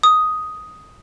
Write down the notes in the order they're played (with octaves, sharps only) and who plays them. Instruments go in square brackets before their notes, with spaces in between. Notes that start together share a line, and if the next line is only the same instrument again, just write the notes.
[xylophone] D#6